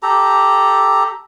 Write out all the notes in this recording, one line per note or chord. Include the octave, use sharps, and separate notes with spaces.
G4 A4 A#5